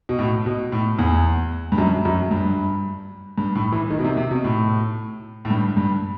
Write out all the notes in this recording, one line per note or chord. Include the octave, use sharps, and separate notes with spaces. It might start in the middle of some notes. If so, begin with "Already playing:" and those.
B2
A2
B2
A2
E2
G2
F#2
F#2
G2
G2
A2
E3
D#3
B2
C3
C3
B2
A2
A2
G2
G2